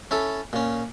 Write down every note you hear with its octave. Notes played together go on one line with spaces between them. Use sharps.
C#4 E4 A4
A#2 C#4